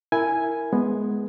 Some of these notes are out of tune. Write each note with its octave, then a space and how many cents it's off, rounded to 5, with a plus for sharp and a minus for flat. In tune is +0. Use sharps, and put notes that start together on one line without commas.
E4 +0 A#4 -10 G#5 +0
G#3 +15 B3 +0